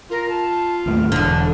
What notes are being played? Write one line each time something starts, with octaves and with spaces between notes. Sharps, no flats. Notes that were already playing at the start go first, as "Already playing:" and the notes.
F4 A#4
A5
D#2 A2 F6
E1 E2 D3